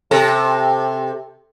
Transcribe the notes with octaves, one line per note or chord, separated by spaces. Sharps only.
C3 A4